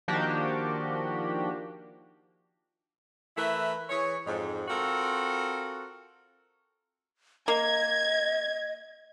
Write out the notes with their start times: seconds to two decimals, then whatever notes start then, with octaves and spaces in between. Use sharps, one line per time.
0.08 D#3 F3 A#3 D4 F#4 G4
3.37 E3 A3 E4 A#4 B4
3.88 E3 G#4 C#5
4.25 F2 G#2
4.68 C4 F4 F#4 A4 A#4
7.48 A#3 D#5 G#6